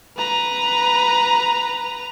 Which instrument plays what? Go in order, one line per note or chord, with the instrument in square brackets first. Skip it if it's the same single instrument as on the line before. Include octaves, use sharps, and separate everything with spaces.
[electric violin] B4 A#5